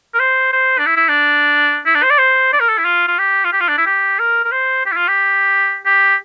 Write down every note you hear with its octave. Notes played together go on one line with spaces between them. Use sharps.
A#4
C5
C5
D4
E4
E4
D4
E4
D4
C5
D5
C5
D5
A#4
A4
E4
F4
F4
G4
F4
G4
F4
D4
E4
G4
A#4
A#4
C5
G4
E4
F4
G4
G4